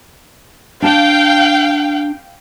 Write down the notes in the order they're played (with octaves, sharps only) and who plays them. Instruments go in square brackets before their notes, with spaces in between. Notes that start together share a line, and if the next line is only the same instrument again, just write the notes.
[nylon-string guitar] D4 A5 [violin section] F5 G5